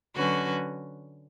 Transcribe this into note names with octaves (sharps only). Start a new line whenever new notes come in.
D3 F#3 C#4 F#4 B4